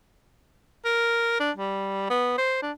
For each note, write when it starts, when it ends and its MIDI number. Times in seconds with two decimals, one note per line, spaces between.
0.85 1.36 70
1.40 1.51 62
1.57 2.06 55
2.10 2.33 59
2.38 2.58 72
2.62 2.71 62